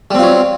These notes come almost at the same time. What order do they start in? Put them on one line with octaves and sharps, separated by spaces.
G3 C4 F4 F#3